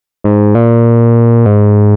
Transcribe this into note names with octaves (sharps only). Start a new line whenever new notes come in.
G#2
A#2
G#2